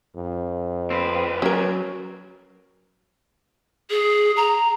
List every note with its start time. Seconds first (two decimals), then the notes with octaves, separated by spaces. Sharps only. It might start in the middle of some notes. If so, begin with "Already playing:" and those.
0.16 F2
0.90 D2 C4 B4
1.42 F#3 C#4 A#4
3.90 G#4
4.36 A#5